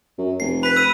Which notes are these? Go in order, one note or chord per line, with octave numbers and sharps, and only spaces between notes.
F#2
F1 C7
B4 B5 B6
E6 D#7